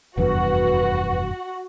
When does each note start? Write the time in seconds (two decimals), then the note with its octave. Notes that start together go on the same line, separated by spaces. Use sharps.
0.18 F1 E2 G2 F#4 B4